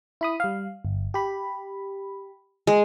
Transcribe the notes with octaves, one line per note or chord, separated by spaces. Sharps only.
E4 B5 D#6
G3 F5
G1
G4 B5
G#3